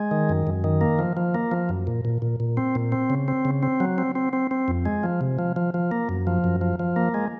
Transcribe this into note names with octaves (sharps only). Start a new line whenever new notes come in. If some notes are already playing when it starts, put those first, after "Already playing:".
Already playing: G#3
D#3
F#2
F#2
D#3
A#3
F3
F3
A#3
F3
F#2
A#2
A#2
A#2
A#2
C4
A#2
C4
C#3
C4
C#3
C4
F#3
C4
C4
C4
C4
F2
G#3
F3
C3
F3
F3
F3
A#3
F#2
F3
F#2
F3
F3
A#3
G#3